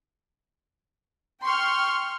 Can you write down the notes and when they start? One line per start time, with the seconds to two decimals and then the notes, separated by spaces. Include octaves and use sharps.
1.44 G5 C6 C#6 F6